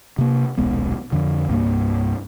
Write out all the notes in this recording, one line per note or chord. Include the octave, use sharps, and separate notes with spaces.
C3 A#3
D#1 B1 G#3 B3
F2 D3
C2 G2 A#3